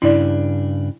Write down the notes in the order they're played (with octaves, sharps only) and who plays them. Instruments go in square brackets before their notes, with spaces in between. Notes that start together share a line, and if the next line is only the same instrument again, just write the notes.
[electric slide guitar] G2 C#3 D4 [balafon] E4 D5